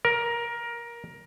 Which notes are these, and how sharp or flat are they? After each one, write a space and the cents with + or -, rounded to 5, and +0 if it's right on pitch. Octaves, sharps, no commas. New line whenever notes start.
A#4 +15